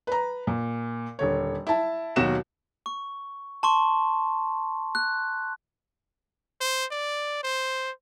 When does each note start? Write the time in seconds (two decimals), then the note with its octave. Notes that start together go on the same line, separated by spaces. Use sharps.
0.07 B4 A#5
0.47 A#2
1.19 D#1 D3 C#5
1.67 E4 A5
2.16 D#2 B2 F#3 F#4 E7
2.86 C#6
3.63 A5 C6 C#6
4.95 F#6
6.61 C5
6.92 D5
7.43 C5